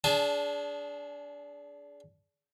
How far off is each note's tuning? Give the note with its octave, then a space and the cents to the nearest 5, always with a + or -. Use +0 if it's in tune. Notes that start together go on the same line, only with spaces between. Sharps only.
D4 -25 G#4 +10 A5 +0